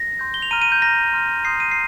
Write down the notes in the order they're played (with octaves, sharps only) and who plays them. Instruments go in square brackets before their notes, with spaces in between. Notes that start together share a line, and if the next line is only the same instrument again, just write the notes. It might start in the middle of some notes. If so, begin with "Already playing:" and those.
Already playing: [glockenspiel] A#6
C6 G6
G7
F7
A#5 F6 D#7
D#7
G6
A#5 F6 A#6
C6 F6
C6 D#6 G6 C7
D#7
C7